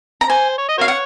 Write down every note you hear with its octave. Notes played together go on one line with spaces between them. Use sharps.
A#5
C5 G#5
C#5
D#5
F#4 A#4 C#5 F5
F#5